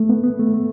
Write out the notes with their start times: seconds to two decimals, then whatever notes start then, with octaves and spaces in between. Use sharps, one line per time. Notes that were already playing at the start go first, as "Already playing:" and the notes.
Already playing: A3
0.09 B3
0.24 B3
0.40 A3
0.54 A3